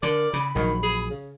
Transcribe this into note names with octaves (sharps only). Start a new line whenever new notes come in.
D3 A#4 D5
C#3 B5
A#1 D#3 F#3
G#4
C#3